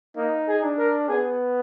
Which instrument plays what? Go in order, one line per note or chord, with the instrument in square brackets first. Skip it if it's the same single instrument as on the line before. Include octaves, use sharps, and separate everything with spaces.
[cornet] A#3 [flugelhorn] D#4
[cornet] G#4
[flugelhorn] D4
[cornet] A#4
[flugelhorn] B3 [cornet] G#4